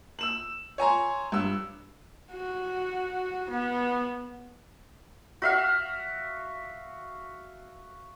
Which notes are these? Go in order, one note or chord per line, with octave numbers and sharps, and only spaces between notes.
E6 E7 F#7
C#5 G#5 A#5 C6
G2 E6
F#4
B3
F#4 E5 F5